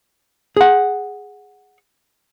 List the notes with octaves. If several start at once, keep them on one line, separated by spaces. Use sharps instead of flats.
G#4 F#5